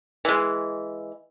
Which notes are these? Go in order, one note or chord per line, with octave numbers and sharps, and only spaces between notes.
E3 G#3